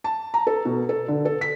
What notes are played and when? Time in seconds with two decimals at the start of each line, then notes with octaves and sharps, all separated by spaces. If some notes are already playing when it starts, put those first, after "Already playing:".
0.04 A5
0.34 A#5
0.47 A4
0.65 B2
0.89 A4
1.08 D3
1.25 A4
1.41 B6